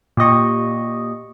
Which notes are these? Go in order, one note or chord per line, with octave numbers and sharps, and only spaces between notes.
A#2 G4 D#5 C#6